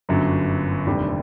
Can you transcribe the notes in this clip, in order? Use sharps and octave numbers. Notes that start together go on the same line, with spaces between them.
G1 F#2 D3 F#3
F1 D#2 D3 G3 C4